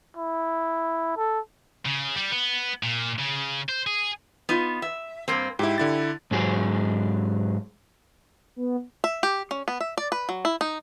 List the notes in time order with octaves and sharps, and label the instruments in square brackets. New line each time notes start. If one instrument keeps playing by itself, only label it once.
[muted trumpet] E4
A4
[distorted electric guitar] C#3
G3
B3
A#2
C#3
C5
G#4
[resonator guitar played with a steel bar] B3 D#4 F4
E5
G2 A#3 C4
[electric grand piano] G#2 E4 [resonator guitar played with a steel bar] G4
[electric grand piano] D3 E4 A6
[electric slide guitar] G#2 F#3 G#4
[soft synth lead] B3
[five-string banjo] E5
G4
C#4
B3
E5
D5
B4
F#3
E4
D#4